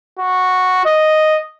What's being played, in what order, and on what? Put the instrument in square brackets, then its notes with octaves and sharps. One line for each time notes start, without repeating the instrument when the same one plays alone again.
[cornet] F#4
D#5